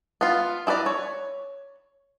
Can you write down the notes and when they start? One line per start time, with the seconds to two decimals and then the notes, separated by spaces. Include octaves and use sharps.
0.21 B3 F4
0.67 E4 G#4 B4 D5 A#5
0.86 C#5